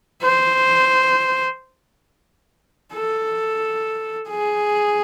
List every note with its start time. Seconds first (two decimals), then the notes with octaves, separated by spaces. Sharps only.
0.22 C5
2.94 A4
4.30 G#4